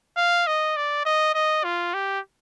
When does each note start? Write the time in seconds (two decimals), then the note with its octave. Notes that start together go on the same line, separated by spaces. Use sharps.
0.17 F5
0.47 D#5
0.76 D5
1.05 D#5
1.34 D#5
1.64 F4
1.94 G4